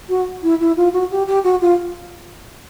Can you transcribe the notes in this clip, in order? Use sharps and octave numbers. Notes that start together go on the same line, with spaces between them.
F#4
E4
E4
F4
F#4
G4
G4
F#4
F4